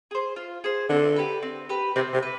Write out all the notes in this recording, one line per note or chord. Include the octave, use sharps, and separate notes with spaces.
G#4 C5
F4
G#4 C5
D3 C4
G4 B4
C4
G4 B4
C3 C4
C3
B4